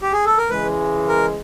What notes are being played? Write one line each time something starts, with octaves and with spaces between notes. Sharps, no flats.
G4
G#4
A4
A#4
C#3 E3 G#3 B4
A#4